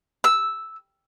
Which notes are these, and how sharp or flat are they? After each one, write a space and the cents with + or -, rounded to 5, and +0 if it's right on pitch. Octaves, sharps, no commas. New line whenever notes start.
E6 -5